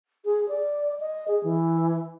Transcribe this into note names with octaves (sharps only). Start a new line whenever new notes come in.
G#4
D5
D#5
G#4
E3